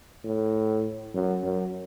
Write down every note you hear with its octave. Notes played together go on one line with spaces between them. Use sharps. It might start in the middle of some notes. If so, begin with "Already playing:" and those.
A2
F#2
F#2